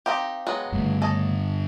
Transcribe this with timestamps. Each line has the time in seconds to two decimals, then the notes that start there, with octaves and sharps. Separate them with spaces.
0.06 C4 D#4 G4 F5 G5 A#5
0.47 F#3 G#3 B3
0.72 G1 G2 C#3 A3
1.02 A4 C#5 D#5